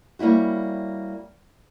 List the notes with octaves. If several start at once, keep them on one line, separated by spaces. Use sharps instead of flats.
G3 A#3 C#4 E4 F#4